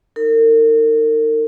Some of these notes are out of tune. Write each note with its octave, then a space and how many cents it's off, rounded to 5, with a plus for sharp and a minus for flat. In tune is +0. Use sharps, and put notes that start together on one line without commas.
D#4 +0 A#4 -40